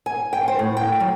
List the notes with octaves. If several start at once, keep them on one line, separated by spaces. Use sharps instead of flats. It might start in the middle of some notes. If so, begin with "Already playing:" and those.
G#5
G5
C5
A2
G5
F#3